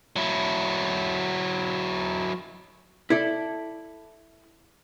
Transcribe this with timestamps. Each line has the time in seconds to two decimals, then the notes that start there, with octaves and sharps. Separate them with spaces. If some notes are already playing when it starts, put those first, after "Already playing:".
0.16 F#3 E4
3.10 E4 A4 D5